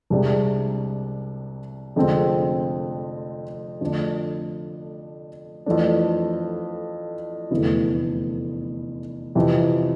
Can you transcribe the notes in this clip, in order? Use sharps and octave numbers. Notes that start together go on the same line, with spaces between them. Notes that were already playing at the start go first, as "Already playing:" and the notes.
C2 C3 G#3 D4
F1 F2 D3 G#3 C4
F2 D3 A3 D4
F2 E3 A3 D4
F1 E2 D3 A3 E4
F2 C3 E3